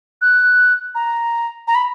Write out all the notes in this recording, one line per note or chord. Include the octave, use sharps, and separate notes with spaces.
F#6
A#5
A#5
B5